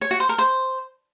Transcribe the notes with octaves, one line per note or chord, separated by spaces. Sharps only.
C#5
F#4
C5
A#4
C5